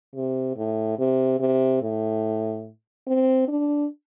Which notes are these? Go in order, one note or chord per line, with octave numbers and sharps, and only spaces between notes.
C3
A2
C3
C3
A2
C4
D4